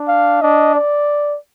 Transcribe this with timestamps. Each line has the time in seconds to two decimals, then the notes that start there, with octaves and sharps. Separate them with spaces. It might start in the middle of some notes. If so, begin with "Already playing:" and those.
Already playing: D4
0.08 F5
0.42 D4 D#5
0.75 D5